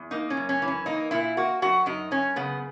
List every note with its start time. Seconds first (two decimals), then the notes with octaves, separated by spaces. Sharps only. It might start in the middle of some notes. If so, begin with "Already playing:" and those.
Already playing: E2
0.11 A#3 D#4
0.30 C#4
0.37 F#2
0.49 C#4
0.62 E3
0.68 C#4
0.86 A#3 D#4
1.11 A#2 E4
1.37 A#3 F#4
1.62 F#2 F#4
1.86 F#2 D#4
2.11 F#2 C#4
2.36 C#3 B3